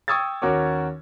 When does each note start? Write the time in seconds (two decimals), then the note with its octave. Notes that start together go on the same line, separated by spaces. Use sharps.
0.08 G5 C#6 D#6 E6 G#6 A6
0.42 D#2 C#4 F#4 A#4 C#5 D6